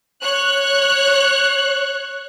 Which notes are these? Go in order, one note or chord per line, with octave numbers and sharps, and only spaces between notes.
C#5 F#6